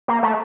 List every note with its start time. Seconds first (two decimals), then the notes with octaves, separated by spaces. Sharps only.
0.08 A#3
0.23 A3